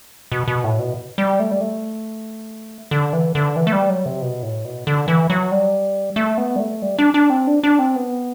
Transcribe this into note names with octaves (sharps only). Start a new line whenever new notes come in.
B2
B2
A2
B2
G3
A3
G3
A3
D3
E3
D3
E3
A3
G3
F#3
C3
B2
A2
B2
D3
E3
F#3
G3
A3
B3
G3
A3
G3
D4
D4
C4
D4
D4
C4
B3